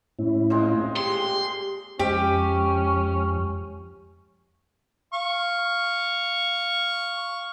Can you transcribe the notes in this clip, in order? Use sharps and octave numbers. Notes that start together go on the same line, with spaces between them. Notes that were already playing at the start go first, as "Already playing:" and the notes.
A2 C#4 E4
A#2 G#3 C4
G4 G#4 C6
F2 F3 G#3 C#4 G4
F5 C#6